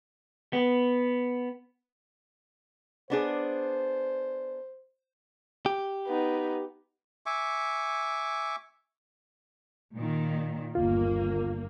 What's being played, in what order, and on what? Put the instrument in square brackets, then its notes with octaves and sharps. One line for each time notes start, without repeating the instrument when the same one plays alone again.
[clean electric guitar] B3
[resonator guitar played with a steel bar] B3 D4 G#4 [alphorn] C5
[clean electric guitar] G4
[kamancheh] B3 D#4
[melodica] E5 G#5 C#6 D6
[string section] A#2 D#3
[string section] G1 A#3 [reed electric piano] D#2 F4